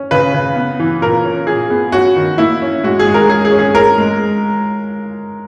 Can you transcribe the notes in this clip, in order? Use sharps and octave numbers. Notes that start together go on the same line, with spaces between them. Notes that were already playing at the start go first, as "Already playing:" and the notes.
Already playing: C#4
C#3 B4
C#3
B3
E3
A#2 A#4
C#4
A#2 G#4
B3
C#4 F#4
D#3
A#3 E4
C#4
G#3 F#4
G#4
G#3
A#4
C#4 G#4
G#4
C#4
G#4
C#4 A#4
G#3